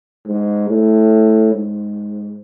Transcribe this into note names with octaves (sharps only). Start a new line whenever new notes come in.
G#2
A2
G#2